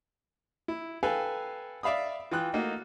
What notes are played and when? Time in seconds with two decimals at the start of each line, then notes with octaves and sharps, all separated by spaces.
0.68 E4
1.03 A4 B4 F5 G5 G#5
1.83 D5 E5 F5 B5 D#6
2.31 E3 F4 G5 D#6 F#6
2.53 A3 A#3 D#4 F#4